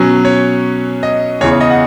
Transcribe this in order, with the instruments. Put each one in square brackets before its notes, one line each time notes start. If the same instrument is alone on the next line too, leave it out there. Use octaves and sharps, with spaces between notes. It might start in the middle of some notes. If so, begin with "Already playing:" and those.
Already playing: [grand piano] B2 F#3 C#4
C#5
D#5
E2 C#3 E3 C#5
C#5
D#5
F#5